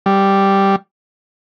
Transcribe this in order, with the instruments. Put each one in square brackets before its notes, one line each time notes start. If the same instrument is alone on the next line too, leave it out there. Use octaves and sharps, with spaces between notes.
[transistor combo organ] G3